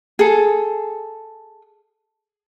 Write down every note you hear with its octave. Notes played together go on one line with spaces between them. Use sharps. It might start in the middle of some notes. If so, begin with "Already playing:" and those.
G#4 A4